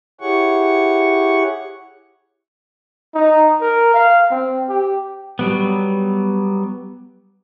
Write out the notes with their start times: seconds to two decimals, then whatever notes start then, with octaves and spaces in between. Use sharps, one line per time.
0.21 E4 G4 G#4 C#5 F#5 C#6
3.15 D#4
3.61 A#4
3.94 F5
4.31 C4
4.69 G4
5.39 F#3 G3 B3